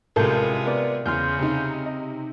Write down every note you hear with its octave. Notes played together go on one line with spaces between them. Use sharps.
A1 C3 G#3 F4 A4 A#4 A5 G6
B3 A#4 D5
E2 C#3 C6 F6 G6
C3 D#4
D#5